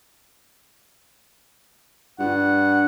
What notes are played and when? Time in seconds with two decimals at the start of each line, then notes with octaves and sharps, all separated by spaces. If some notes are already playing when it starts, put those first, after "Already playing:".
2.19 G2 F#5